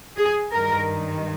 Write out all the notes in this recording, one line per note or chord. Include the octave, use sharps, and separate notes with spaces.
G#4
G2 D#3 A#4